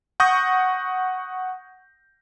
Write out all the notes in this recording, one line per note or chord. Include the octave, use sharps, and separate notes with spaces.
F#5 C#6 D#6 G6 A#6